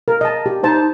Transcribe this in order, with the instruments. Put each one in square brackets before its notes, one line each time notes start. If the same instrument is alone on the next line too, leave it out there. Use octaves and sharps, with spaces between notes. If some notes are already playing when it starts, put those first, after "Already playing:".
[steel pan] A#4
D#5 A5
G4
[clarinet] D#4 [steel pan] G4 C5 A5